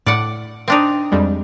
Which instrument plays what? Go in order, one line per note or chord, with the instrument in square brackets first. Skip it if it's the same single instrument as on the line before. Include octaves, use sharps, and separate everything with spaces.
[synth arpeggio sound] A2 [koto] D5 F#5
[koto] C4 D4 D#4
[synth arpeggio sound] F2 G3 G#3